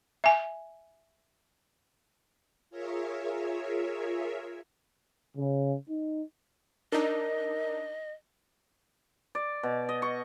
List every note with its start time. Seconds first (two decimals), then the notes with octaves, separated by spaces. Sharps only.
0.24 E5 G#5
2.70 F4 G#4 A#4 C#5 E5
5.37 C#3
5.88 D#4
6.92 D4 D#4 A#4 D#5
9.35 D5
9.63 B2
9.89 D#5
10.02 C#6